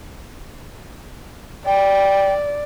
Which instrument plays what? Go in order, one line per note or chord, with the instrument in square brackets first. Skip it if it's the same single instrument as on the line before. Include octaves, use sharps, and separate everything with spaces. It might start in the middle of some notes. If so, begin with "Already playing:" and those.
[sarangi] D5 [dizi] G5